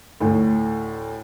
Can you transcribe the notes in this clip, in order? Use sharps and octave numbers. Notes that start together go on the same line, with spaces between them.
D2 A2